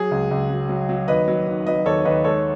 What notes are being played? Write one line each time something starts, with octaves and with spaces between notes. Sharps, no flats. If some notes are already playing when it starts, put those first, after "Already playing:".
Already playing: F#3 G#4
C#2
C#2
F#3
F#3
F#3
D#2 B4 D#5
F#3
D#3
F#3 B4 D#5
D#2 A4 C#5
D#2 B4 D#5
G#3 A4 C#5